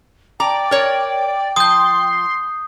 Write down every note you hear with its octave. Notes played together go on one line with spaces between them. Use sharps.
D5 G5 A#5
A#4 C#5
F3 C6 D#6 G6